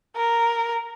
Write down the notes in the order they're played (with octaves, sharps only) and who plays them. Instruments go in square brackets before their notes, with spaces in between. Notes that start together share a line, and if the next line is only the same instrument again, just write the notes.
[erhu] A#4